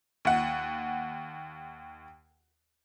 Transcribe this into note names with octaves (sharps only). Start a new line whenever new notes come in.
D#2 F#5